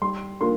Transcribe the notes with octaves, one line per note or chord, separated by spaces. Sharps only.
G3 C6
A#3 D4 F4 C6